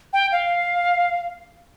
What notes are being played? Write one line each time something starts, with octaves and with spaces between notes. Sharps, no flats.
G5
F5